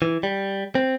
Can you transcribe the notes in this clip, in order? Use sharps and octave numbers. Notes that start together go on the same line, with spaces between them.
E3
G3
C4